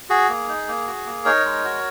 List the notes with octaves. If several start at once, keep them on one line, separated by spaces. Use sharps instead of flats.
F#4 G#4
A#3
D#4
A#3
F#4
A#3
D#4 A#4 C#5
G#3
F#4